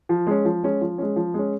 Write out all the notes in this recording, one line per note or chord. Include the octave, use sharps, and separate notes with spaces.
F3
G#3 C#4
F3
G#3 C#4
F3
G#3 C#4
F3
G#3 C#4